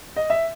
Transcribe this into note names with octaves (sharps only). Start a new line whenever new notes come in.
D#5
E5